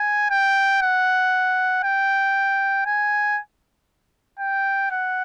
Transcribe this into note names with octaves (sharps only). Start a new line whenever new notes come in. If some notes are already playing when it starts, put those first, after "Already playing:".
Already playing: G#5
G5
F#5
G5
G#5
G5
F#5